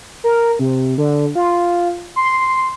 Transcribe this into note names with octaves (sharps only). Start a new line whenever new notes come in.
A#4
C3
D3
F4
C6